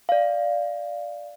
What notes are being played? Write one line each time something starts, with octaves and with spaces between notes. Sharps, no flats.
D5 F5